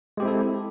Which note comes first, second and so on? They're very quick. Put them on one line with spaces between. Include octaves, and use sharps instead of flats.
G#3 G4 C4 E4 A4